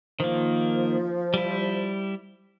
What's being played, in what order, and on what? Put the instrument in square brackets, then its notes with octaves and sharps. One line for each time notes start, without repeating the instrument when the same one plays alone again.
[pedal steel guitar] D#3 A#3 [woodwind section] F3
[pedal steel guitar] G3 E4